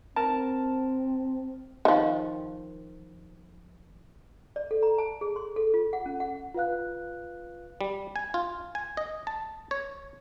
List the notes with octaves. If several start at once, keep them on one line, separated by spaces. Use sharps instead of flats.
C4 A#4 A5
D#3 F3
D5
A4
A#5
A5
G#4
C6
A4
F4
F#5
C#4
F#5
F4 B4 F5 F#6
G3
G#5
F4
G#5
D#5
A5
C#5